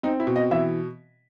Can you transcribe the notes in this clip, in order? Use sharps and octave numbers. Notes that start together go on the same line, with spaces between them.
C4 D#4
E4
B2
D#5
E3 E5